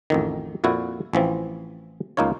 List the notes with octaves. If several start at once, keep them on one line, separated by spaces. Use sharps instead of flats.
A1 F2 D#3
F2 A#2 E4 F#4
A1 E3 F3 C4
C#2 A#3 D#4 F4 C#5